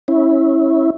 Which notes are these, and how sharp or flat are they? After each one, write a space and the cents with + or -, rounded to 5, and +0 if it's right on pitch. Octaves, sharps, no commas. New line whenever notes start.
C#4 -20 E4 -15